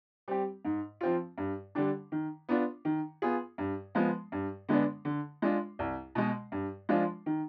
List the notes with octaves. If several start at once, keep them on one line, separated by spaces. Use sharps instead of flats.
G3 C4 G4
G#2
F3 C4 F4
G2
D3 G3 D4
D#3
B3 D4 F4
D#3
B3 F4 G#4
G2
F3 G#3 B3
G2
D3 G#3 B3 D4
D3
G#3 D4 F4
C2
B2 G#3
G2
F3 G#3 D4 F4
D#3